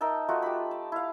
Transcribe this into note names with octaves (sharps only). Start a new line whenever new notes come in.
D#4 A#4 E5 A5
A3 D#4 F4 F#4
G4 B5
A5
E4 F5